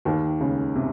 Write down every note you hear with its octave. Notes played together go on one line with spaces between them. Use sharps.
D#2 D#3
C#2 C#3
C3